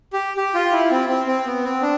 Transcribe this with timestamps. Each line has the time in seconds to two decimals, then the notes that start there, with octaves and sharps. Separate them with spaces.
0.13 G4
0.37 G4
0.54 F4
0.72 E4
0.91 C4
1.09 C4
1.26 C4
1.45 B3
1.63 C4
1.81 D4